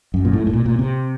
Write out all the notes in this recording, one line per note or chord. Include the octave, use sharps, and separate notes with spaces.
F#2
A#2
A2
A2
A#2
A#2
C3